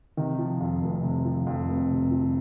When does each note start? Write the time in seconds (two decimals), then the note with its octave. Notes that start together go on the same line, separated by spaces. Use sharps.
0.17 C3 D#3
0.39 F3
0.61 F2
0.82 F1
1.03 C3
1.25 F3
1.47 F2
1.68 F1
1.90 C3
2.11 F3